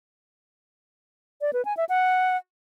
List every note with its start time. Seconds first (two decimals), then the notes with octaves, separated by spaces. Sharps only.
1.41 D5
1.53 B4
1.65 G#5
1.77 E5
1.89 F#5